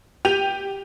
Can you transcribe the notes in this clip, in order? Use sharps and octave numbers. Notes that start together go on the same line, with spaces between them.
G4 G5 G6 D#7 F7